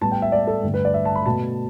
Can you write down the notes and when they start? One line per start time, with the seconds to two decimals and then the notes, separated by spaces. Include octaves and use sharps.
0.01 A2 G3 B3 A5
0.12 G5
0.22 E5
0.32 D5
0.47 A4
0.63 G2 D3 A3
0.74 B4
0.85 D5
0.94 E5
1.05 A5
1.16 B5
1.26 B2 A3 A5